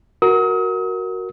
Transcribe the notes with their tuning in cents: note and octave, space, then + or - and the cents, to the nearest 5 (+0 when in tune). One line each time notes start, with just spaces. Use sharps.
F#4 +0 A#4 +0 D#6 +40